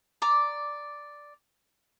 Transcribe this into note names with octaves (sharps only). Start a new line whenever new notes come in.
D5 A#5 D6